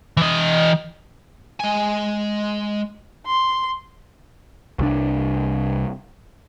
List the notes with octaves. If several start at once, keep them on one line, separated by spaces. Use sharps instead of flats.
E3 D#5
G#3 G#5
C6
C2 F3 D4